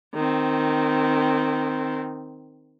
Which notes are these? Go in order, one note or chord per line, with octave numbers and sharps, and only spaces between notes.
D#3 C4